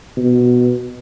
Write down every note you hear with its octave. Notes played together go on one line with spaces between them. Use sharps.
B2